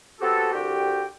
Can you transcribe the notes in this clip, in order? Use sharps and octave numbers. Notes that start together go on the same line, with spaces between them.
B3 C4 F#4 G4 A4
C2 D3 F#4 G4 G5